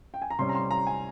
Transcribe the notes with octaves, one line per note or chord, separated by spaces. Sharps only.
G5
G#5
A#5
C3 G3 C#4 C6
A#5
C6
A#5
G#5